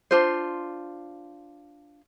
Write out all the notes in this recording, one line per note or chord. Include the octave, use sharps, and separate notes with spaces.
D4 F4 C5